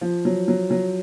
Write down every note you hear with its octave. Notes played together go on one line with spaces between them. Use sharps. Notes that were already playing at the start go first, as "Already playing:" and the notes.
F3
F#3
F#3
F#3